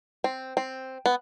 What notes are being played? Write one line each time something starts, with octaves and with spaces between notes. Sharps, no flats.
C4
C4
B3